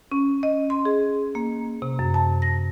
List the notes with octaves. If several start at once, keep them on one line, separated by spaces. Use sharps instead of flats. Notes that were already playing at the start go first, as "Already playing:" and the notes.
C#4
D#5
C6
G#4
A#3
C3
F#2
A5
A#6